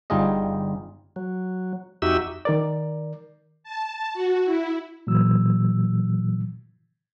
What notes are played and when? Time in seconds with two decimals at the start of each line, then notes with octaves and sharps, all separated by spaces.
0.10 G1 G3 D#4 F4 G#4 D#5
1.16 F#3
2.02 F2 D#4 F#4 G4 E5 E6
2.45 D#3 A#4 D5
3.64 A5
4.14 F#4
4.45 E4
5.07 A#2 E3 F#3 E6